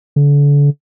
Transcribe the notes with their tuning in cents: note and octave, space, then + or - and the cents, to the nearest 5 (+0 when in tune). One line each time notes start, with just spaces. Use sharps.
D3 -35